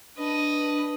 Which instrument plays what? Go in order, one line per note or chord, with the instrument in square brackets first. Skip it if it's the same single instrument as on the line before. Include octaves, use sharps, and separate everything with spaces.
[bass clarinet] D4 [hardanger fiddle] B4 D#5